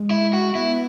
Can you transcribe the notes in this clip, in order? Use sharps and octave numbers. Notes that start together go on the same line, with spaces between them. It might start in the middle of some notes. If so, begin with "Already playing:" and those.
Already playing: G#3
E4
F#4
B3 E4